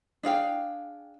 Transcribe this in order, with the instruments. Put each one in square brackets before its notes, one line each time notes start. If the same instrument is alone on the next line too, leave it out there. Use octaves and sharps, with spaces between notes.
[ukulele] D4 G#4 F5 G5